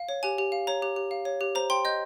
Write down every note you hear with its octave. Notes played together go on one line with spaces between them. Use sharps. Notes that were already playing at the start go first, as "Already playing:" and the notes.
Already playing: F5
C#5
G4 G#5
G4
F5
C#5 A#5
G4
G4
F5
C#5
G4
C5 A#5
G5 C6
D#5 G6